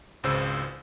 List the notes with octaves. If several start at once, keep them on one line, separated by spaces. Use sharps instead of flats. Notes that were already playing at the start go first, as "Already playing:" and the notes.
G#1 C#2 C#3 C5 E6